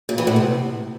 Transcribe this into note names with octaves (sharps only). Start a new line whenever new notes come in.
A#2
E3
A2
C3